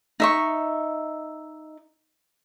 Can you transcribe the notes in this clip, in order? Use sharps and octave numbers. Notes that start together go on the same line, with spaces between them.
D#4 E5 C#6